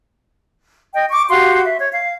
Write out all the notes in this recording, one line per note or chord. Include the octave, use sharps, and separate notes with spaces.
D#5 G5
C#6 D6
F#4 G4 F5 C6
E5
C#5
F5